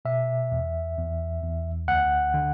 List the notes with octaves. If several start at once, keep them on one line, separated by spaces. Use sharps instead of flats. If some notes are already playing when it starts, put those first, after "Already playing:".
B2 E5
E2
E2
E2
D2 F#5
D3